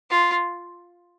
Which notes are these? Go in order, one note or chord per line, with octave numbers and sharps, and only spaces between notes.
F4